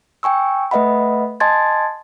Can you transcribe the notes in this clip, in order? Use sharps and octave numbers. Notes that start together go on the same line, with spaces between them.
G5 G#5 C#6 E6
A3 B4 D#5 E5 F#5 B5
D#5 G#5 A5 C6 G#6 A6